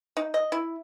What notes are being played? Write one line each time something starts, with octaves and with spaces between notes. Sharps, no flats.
D#4
D#5
E4